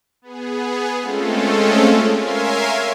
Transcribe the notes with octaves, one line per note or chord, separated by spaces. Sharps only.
B3 G#4
G#3 A3 C4 C#4 F4 A4
A#4 C#5 E5 F5 G#5 C6